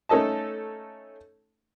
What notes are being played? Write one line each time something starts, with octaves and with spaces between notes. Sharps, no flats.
A3 C#4 D#4 A4 D#5 A5